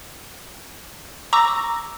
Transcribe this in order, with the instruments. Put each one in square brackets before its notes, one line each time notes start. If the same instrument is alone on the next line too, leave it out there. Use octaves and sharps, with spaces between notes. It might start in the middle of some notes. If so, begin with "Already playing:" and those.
[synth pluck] A#5 [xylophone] C#6 D6 E6